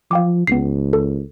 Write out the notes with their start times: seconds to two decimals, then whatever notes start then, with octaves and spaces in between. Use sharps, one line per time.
0.11 F3 F5 G5 D6
0.47 C#2 B3 C7
0.93 A4